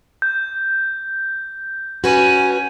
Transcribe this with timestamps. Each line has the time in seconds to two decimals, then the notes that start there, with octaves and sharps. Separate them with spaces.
0.22 G6
2.04 C#4 F#4 B4 G#5